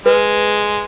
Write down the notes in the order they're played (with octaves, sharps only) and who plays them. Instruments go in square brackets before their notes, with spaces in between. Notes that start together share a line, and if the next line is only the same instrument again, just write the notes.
[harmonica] G#3 [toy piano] B4